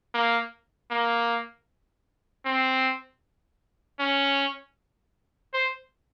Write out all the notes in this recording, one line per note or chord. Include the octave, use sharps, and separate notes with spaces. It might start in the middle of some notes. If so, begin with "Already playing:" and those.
A#3
A#3
C4
C#4
C5